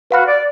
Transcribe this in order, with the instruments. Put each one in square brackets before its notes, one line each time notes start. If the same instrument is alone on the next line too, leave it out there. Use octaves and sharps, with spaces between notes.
[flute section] F#4 [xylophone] B4 F5 B5 F6
[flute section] D5